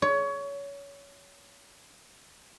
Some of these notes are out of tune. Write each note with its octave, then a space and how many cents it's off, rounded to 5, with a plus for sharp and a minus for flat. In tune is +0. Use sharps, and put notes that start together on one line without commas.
C#5 +25